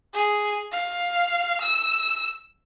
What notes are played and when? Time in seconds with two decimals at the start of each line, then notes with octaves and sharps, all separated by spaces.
0.13 G#4
0.72 F5
1.61 E6